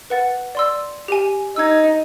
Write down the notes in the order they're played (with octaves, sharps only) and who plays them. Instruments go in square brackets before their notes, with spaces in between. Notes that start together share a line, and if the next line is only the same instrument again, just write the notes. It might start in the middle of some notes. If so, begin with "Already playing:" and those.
[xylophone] B4 F#5 A6
D5 C6 E6
G4 G#5
[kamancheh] D#4 [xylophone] E6 G#6